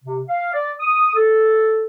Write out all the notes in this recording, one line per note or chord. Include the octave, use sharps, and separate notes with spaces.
C3
F5
D5
D#6
A4